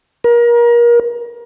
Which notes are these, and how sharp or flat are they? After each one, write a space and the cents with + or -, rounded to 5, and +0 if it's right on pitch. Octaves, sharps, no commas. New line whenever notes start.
A#4 +30